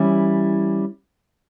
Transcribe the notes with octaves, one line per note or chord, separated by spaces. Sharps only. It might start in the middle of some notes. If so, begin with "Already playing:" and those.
Already playing: E3 G3 C#4 E4